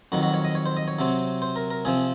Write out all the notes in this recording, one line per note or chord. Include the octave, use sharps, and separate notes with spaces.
F2 D#3 F#3 F#4
F#4
C#5
D#5
C#5
C5
D#5
C#5
C3 F#3 C4
C5
A#4
A#4
C3 F3 C4 G#4